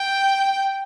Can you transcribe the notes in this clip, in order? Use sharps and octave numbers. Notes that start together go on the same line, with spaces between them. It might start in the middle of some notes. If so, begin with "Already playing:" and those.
Already playing: G5